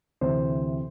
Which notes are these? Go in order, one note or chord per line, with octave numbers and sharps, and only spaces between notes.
D2 C3 E3 C5